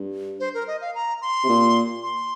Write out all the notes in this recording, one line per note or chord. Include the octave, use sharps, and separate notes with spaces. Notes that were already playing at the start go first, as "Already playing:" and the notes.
Already playing: G2
C5
A#4
D#5
F5
A#5
C6
C3
A#2
C6